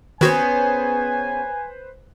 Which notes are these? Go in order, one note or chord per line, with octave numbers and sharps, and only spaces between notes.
D#3 B3 C#4 F#4 G#4 B4 C5 G#5